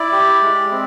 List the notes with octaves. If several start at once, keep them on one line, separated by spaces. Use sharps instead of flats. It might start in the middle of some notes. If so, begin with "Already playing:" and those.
Already playing: E4 D5
G4
G#3
C4